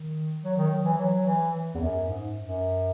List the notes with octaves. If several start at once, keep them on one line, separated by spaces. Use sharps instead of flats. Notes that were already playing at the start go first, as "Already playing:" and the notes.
Already playing: D#3
F#3
D#3
F#3
E3
F#3
E3
E2
F#2
G#2
F#2